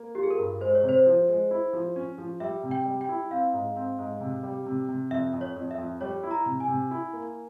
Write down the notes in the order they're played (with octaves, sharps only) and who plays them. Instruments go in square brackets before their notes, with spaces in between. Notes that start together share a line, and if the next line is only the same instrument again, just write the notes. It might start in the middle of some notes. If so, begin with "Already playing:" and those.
Already playing: [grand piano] A#3
[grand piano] F4 [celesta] G4
[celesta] G#4
A#4
[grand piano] G2
[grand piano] G#3 [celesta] C5
[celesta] C#5
[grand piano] C3
[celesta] C5
[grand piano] F3
G#3
E4
F3
C#4
F3
[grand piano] G3 [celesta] E5
[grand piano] C3
[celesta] G5
[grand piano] G3
[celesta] G5
[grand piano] E4
[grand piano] C4 [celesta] F5
[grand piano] G#2
C4
G#2
C3
G3
C3
C3
[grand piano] F2 [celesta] E5
[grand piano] F2
[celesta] C#5
[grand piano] F2
[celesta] E5
[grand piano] F2
[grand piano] G3 [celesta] C#5
[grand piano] E4
[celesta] A#5
[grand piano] C3
[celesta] G#5
[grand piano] C3
E4
A#3